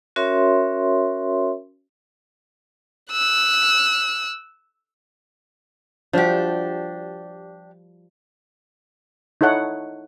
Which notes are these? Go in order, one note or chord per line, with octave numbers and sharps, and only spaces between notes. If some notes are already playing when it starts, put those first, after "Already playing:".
C#4 F#4 A#4 C#5 E5 C6
E6 F#6
F3 G3 D4 F#4 G4
D#4 E4 A4 C#5 F#5